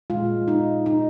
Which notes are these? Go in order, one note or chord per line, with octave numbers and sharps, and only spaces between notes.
A#2 G#3 F4
D#4
D#4